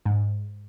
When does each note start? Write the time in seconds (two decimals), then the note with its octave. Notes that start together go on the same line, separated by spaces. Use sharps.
0.06 G#2